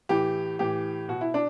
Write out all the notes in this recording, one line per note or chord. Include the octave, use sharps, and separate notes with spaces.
A2 E3 G4
A2 E3 G4
B2 F#4
E4
D4